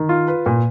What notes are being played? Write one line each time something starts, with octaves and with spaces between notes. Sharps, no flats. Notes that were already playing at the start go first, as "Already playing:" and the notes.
Already playing: D#3
F4
B4
A#2